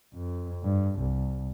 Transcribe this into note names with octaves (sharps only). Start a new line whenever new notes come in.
F2
G2
C2